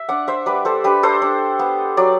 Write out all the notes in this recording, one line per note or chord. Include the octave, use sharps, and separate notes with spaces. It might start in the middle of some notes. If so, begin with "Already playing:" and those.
Already playing: E5
D4 D5 F#5
C5 E5
G3 B4 D5
A4 C5
D4 G4 B4
A4 C5
D4
B3
F#3 D5